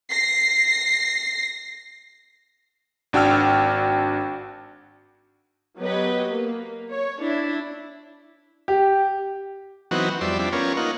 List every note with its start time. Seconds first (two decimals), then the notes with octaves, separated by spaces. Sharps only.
0.11 A#6 C7
3.13 G#1 D4 F#4 G5 E6 F6
5.78 F#3 B3 G4 B4 D#5
6.29 A#3
6.90 C#5
7.20 D4 E4
8.68 G4
9.91 E3 F#3 B3 C4 D#4 F#4
10.21 F2 G3 D5 E5 C6
10.39 F3 G3 C4 D4 E4
10.52 B3 C#4 F4 A#4 C#5
10.77 A#3 D#4 F4 F#5